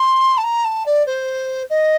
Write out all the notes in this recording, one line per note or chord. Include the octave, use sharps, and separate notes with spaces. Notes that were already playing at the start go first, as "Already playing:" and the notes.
Already playing: C6
A5
A#5
A5
D5
C5
D#5